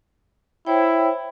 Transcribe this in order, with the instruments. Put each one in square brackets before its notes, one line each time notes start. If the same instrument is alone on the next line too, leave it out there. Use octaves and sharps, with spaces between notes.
[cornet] E4 [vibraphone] C5 C#5 G5